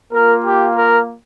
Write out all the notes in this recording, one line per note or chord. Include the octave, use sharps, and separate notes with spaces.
A#3 F4 A#4
G4
A#4